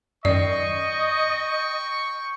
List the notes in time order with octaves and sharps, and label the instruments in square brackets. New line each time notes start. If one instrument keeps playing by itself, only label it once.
[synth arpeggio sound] F#2 D#3 [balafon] D5 [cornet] D#5 [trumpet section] G5 C#6